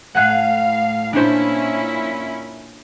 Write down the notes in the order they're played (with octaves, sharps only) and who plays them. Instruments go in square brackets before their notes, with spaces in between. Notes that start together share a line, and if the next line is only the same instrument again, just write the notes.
[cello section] A2 F5 [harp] F#5 G#5 F#6
[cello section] A#2 C#4 E4 [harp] D4 C5